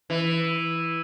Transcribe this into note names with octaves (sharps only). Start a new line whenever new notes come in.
E3